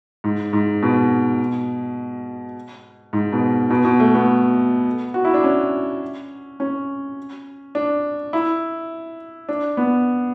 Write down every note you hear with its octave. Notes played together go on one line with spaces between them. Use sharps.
G#2
G#2
B2
G#2
B2
B2
B2
A3
B3
F#4
E4
D4
C#4
C#4
D4
E4
D4
B3